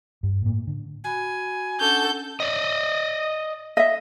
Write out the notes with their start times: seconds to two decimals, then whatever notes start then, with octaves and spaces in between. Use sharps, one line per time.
0.23 G2
0.42 A2 A#3
0.67 D3
1.04 F#4 G#5 B5
1.80 C#4 D4 A4 F#5 G6
2.40 D5 D#5
3.77 D#5 E5